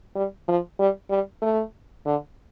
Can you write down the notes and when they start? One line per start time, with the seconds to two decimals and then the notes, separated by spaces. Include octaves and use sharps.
0.15 G3
0.48 F3
0.79 G3
1.10 G3
1.42 A3
2.06 D3